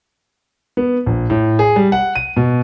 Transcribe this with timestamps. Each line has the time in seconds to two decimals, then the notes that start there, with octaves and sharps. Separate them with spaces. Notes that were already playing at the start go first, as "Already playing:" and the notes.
0.77 B3
1.06 A#1
1.30 A2
1.59 G#4
1.76 G3
1.92 F#5
2.15 D#7
2.37 B2